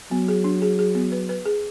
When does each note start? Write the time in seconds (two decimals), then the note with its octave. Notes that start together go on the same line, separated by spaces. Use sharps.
0.11 F#3 B3
0.28 G#4
0.44 D4
0.62 G#4
0.79 G#4
0.95 B3
1.12 B4
1.29 B4
1.46 G#4